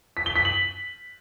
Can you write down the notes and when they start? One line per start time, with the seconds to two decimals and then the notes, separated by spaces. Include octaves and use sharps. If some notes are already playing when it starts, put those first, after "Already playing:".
0.17 B6
0.26 G7
0.36 B6
0.45 F#7